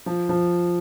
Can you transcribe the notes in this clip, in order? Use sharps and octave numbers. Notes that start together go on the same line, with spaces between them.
F3
F3